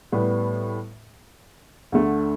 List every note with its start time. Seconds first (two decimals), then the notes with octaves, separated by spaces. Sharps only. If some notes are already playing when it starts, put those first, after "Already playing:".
0.12 A2 G3 B3
1.92 D2 D3 A3